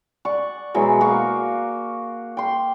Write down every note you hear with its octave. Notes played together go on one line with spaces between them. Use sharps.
D5 F#5 C#6
B2 E3 F#3 G#3
A#3 F#4 F5 C#6
G5 C6